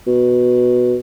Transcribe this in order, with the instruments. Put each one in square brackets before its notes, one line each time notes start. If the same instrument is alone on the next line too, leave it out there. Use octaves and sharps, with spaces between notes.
[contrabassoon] B2